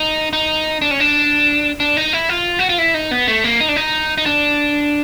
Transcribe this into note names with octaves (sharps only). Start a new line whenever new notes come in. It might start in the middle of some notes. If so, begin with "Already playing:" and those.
Already playing: D#4
D#4
D4
C#4
D4
D4
D#4
E4
F4
F#4
F4
E4
D#4
B3
A3
A#3
D#4
D4
D#4
D#4
D4